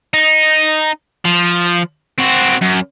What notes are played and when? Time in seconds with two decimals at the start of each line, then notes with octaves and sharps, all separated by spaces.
0.14 D#4
1.25 F3
2.18 C4 F#4
2.61 F#2